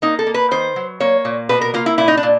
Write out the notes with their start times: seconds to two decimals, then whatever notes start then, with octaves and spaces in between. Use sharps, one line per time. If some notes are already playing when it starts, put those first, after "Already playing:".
0.02 A#3 D#4
0.19 A4
0.27 A#3
0.34 B4
0.51 D#3 C5
0.76 F#3
1.00 A#3 C#5
1.25 A#2
1.49 B2 B4
1.61 A#4
1.74 A#3 F4
1.86 E4
1.98 A#2 E4
2.08 D#4
2.17 D4
2.23 A#2